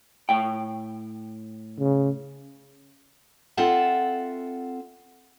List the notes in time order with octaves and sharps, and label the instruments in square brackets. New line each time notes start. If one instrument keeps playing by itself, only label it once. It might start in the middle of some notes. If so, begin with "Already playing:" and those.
[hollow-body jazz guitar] A2 G5
[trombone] C#3
[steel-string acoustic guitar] C4 F4 A4 E5 F#5